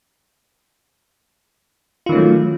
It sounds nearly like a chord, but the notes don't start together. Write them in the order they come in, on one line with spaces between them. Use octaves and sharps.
F4 D#3 C#4 A3 F#3